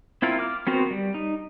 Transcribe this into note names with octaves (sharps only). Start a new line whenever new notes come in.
C4 E4 F4 A#4
D6 F6
B3 C4 F#4 A#4 C5
G3
D#4